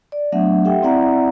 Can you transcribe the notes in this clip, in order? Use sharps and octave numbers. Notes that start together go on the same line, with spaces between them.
D5
F#3 A3 B3 D4 E5 F#5
G4 A4 E5 F#5 G5
C4 E4 D5 E5 F#5 A#5